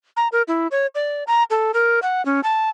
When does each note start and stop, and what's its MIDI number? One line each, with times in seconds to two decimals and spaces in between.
0.17 0.28 82
0.32 0.42 70
0.48 0.67 64
0.71 0.87 73
0.95 1.24 74
1.27 1.44 82
1.50 1.72 69
1.74 2.00 70
2.02 2.24 78
2.25 2.41 61
2.43 2.69 81